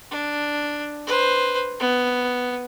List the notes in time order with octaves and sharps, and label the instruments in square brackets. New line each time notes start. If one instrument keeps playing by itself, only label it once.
[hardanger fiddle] D4
B4 C5
B3